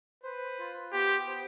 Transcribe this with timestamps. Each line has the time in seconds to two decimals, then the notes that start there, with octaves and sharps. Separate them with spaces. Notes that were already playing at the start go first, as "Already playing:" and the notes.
0.23 B4 C5
0.59 F4
0.93 B3 G4
1.27 C5